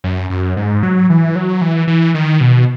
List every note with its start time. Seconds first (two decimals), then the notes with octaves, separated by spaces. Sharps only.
0.04 F#2
0.30 F#2
0.57 G#2
0.83 F#3
1.10 E3
1.36 F#3
1.61 E3
1.88 E3
2.15 D#3
2.41 B2